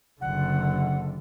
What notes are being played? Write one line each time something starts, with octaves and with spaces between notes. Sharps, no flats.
F#1 D3 F#5